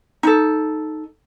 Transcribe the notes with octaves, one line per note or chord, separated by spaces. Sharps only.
D#4 A4